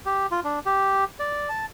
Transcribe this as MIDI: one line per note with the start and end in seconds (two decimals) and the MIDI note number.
0.06 0.27 67
0.31 0.40 65
0.44 0.59 62
0.66 1.04 67
1.20 1.49 74
1.49 1.66 81